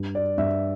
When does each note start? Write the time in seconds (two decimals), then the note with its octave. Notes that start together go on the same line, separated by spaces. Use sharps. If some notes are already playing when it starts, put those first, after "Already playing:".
Already playing: G2
0.15 D5
0.38 G2 E5